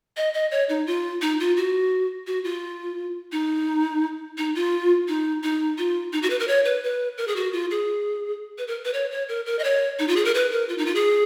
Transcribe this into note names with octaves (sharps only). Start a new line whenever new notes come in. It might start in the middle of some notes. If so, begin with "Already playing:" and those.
D#5
D#5
C#5
D#4
F4
D#4
F4
F#4
F#4
F4
D#4
D#4
F4
D#4
D#4
F4
D#4
F#4
B4
A#4
C#5
B4
B4
A#4
G#4
F#4
F4
G#4
B4
A#4
B4
C#5
C#5
A#4
A#4
D#5
C#5
D#4
F4
G#4
A#4
B4
A#4
F4
D#4
F4
G#4